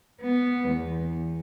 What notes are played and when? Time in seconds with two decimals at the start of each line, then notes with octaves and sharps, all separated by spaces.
0.21 B3
0.69 E2